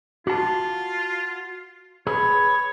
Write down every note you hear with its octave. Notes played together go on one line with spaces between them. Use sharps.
F4 F#4 A5
G#4 B4 C#5